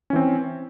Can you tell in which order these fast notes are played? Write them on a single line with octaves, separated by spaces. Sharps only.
C#4 E3 C4